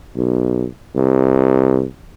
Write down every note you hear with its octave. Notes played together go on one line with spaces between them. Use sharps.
B1
C2